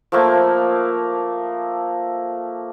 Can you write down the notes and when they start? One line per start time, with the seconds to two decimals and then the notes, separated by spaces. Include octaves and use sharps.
0.12 F3 A3 A#3